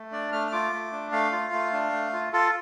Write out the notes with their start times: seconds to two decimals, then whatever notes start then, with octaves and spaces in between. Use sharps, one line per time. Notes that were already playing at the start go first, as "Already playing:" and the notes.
Already playing: A3
0.12 D4 D5
0.32 A3 F6
0.47 F6
0.52 F4 D6
0.72 A3
0.92 D4
1.12 A3 F5
1.32 F4
1.53 A3
1.72 D4
1.93 A3
2.13 F4
2.33 F4 A4